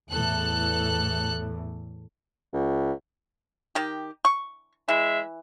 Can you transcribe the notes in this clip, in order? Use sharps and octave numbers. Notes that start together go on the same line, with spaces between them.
E2 A2 E3 A4 F#6
C#2
D#3 G4
C#6
E3 G#3 E5